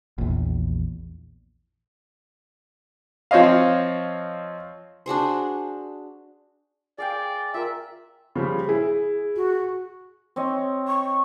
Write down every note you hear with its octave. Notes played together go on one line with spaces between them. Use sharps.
A#1 E2
F3 C4 C#5 D#5 F5
D4 F#4 G#4 C5
G#4 D5 F5 G5
F4 A#4 E5
C#3 F3 G3
E4 G#4
F#4
C4 C#5 D#5
C#6